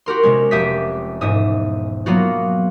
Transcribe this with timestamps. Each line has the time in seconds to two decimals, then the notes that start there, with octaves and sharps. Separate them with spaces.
0.06 F#4 G4 A#4 C6
0.23 C3 G#3 C#4
0.51 F1 G4 E5 D#6 B6
1.21 E1 G#2 E5 D#6
2.06 F#3 A#3 B3 F4 F#4